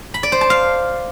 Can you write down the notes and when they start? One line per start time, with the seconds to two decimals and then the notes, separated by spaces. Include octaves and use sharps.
0.14 B5
0.23 D5
0.32 C5
0.41 A5
0.50 F5